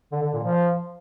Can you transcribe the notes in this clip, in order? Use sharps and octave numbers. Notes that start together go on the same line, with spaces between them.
D3
D3
A#2
F3